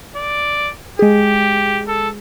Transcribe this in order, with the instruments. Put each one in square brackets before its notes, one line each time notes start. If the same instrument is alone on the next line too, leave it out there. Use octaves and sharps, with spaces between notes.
[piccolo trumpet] D5
[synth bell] G#3 G#4 [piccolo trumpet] G4
[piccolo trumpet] A4